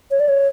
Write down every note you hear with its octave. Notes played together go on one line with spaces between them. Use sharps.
C#5
D5
C#5